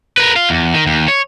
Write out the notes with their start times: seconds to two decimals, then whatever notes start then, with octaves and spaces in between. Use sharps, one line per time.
0.18 A#4 B4
0.36 F4
0.50 E2
0.74 D#3
0.86 D#2
1.08 C#5